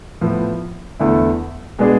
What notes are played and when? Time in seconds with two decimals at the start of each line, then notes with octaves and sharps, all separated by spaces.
0.21 A2 F3 B3
0.99 E2 D3 A3 E4
1.79 B2 G#3 B3 D4 G#4